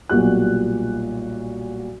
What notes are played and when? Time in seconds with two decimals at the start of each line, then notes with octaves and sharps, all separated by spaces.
0.09 B1 A#2 G3 F#4 F#6